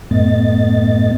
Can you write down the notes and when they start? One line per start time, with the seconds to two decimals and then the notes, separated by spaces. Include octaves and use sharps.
0.11 F#2 A2 A3 B3 D#5 A6